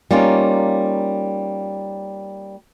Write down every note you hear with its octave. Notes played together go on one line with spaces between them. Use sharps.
G3 A#3 C#4 D#4 F4